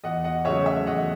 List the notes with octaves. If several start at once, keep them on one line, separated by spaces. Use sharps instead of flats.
E2 D#5 F#5
D#5 F#5
C#3 F#3 A3 C#5 E5
C#5 E5
E2 D#5 F#5